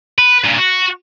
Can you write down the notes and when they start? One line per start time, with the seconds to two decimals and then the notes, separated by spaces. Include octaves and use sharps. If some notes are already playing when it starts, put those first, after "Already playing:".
0.18 B4
0.44 G2 A#2
0.58 F#4